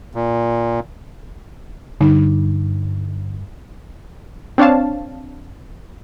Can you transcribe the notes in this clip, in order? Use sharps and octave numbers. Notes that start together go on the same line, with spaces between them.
A#2
G2 D3 D#4
C4 D4 C#5 F5 A5